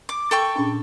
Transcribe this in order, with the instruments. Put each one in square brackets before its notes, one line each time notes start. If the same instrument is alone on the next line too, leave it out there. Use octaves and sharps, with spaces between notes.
[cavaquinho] D6
A4 G5 C#6
[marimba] A#2 C#4 D4